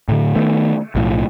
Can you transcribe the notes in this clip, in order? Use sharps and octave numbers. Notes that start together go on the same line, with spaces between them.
A2 D3
D#3 A3 B3
B1 A2 F3